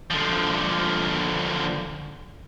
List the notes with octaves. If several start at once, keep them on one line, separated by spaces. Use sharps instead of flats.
D3 F3